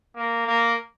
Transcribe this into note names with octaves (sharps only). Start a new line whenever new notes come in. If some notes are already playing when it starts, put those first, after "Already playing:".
A#3
A#3